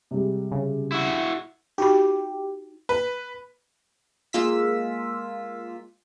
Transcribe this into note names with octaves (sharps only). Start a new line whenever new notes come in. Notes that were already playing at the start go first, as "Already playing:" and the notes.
C3 G3 G#3
C#3
E4 F#4
D#4 F#4 G4 B5
B4
G#3 A#3 F4 E6 B6